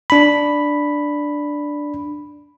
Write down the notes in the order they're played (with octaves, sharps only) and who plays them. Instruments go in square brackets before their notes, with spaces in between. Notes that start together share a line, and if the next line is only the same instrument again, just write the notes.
[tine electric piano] D4 B5